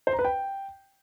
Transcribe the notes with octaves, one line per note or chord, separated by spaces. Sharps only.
C5
A#5
B4
G5